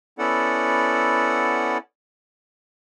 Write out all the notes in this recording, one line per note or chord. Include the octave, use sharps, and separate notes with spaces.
B3 C#4 E4 A4 D5 F#5